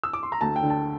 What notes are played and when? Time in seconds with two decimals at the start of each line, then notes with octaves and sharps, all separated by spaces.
0.03 E6
0.13 D6
0.23 C6
0.32 A#5
0.41 D2 A5
0.56 G5
0.63 D3
0.70 A5